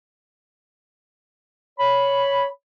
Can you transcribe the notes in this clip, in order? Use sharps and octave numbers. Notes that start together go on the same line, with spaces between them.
C#5 B5